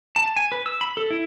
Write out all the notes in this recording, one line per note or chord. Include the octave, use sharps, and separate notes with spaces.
A5
G#5
B4
E6
B5
A4
E4